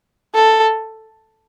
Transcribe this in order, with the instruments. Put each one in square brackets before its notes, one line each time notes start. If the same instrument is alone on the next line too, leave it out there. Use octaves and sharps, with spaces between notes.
[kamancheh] A4